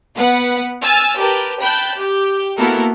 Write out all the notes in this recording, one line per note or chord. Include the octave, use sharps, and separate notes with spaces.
B3 B4 F#5
G#5 E6 F6 A6
G4 A#4 B4 A5
G5 A5 B5 F#6 G6
G4
A#3 B3 E4 F#4 A4 A#4